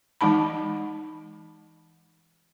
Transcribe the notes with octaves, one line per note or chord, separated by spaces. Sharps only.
E3 G#3 D#4 A5 B5